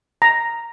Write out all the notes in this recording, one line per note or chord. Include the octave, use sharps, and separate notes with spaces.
A#5